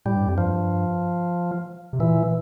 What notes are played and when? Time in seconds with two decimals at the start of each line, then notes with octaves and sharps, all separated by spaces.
0.05 A2 G3
0.15 G2
0.27 F2
0.37 G2 F3
1.93 C3
1.99 A#2 E3